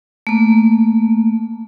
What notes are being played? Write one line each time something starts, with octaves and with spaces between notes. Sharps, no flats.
A3 A#3